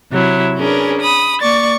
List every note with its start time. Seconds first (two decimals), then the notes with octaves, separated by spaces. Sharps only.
0.11 C3 F#3 E4
0.57 C#4 D4 G#4 A#4 B4
0.99 B5 D#6
1.41 A#3 D5 C#6 A6